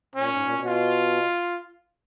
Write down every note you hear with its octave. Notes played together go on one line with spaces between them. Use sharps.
A#2 C#4
G#2
A#2
B2
F4